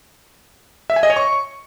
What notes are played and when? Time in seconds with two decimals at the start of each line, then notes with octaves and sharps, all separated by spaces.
0.90 E5
0.96 G#5
1.03 D#5
1.10 C#5
1.16 C#6